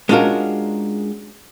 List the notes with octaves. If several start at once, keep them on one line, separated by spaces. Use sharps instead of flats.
G#3 C#4 D4 F4 F#4 A#4